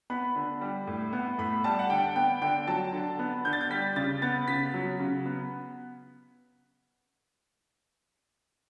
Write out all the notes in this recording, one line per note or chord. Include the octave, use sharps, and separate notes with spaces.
B3 B5
D3
G3
A2
B3
A2 B5
G3 A5
F#5
D3 G5
B3 G5
D3 G5
F#3 A5
D3
B3
D3 G6
A6
G6
G3 B6
C#3 A6
B3 A6
C#3 B6
F#3
C#3
B3